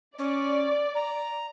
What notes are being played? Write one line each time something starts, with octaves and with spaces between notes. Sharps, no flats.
C#4 D5
A#5